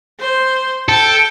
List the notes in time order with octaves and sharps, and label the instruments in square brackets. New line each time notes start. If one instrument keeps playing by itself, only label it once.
[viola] C5
[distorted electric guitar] A4 [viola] G5